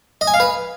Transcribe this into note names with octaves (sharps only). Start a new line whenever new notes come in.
D#5
G#5
F5
B4